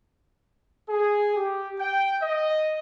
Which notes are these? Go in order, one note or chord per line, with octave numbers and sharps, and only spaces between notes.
G#4
G4
G5
D#5